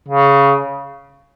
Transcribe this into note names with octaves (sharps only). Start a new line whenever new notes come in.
C#3